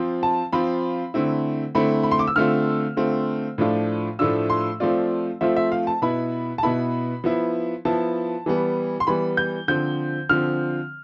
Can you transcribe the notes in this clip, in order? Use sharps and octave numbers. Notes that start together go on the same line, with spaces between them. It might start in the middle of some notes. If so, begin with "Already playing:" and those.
Already playing: F3 C4 F4
A5
F3 C4 F4 B5
D3 A3 C4 E4
D3 A3 C4 E4 B5
B5
C6
D6
E6
D3 A3 C4 F4 F6
D3 A3 C4 F4
A2 F3 A3 D4 F4
A2 F3 A3 D4 F4 E6
C6
F3 A3 C4 F4 D5
F3 A3 C4 F4 E5
E5
F5
A5
B2 B3 E4 B5
A5
B2 B3 E4 B5
F3 B3 E4
F3 B3 E4 A5
E3 G3 B3
C6
E3 G3 B3 B5
G6
D3 F3 C4 G6
D3 F3 C4 F6